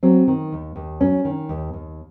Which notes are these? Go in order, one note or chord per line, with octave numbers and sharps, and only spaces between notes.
F#3 C4
D#3
D#2
D#2
F#3 C#4
D#3
D#2
D#2